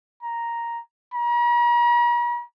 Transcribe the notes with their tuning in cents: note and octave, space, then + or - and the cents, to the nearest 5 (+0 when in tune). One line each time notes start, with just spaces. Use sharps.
A#5 +0
A#5 +45